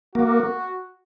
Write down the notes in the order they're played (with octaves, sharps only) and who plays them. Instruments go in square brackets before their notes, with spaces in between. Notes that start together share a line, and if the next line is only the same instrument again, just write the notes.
[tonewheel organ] A#3 [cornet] F#4